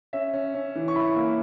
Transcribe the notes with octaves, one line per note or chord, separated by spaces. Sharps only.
C#4 E5
C#4
C#4
E3
C#6
E4 B5
A#3